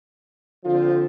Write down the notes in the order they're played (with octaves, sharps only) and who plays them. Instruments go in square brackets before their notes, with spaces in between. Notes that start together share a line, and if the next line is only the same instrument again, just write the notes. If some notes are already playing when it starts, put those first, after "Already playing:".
[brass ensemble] D3 F3 C4 F4